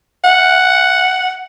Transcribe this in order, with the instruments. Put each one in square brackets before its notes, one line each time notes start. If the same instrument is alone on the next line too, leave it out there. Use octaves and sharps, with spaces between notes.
[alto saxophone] F#5